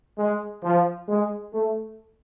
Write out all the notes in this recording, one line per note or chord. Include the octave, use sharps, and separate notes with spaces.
G#3
F3
G#3
A3